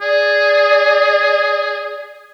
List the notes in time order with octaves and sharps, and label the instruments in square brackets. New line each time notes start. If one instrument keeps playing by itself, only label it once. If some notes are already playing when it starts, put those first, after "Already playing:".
[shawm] G#4 [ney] D5